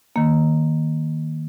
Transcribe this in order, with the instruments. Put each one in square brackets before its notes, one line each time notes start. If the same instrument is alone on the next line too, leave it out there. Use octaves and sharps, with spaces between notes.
[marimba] D#3 A#3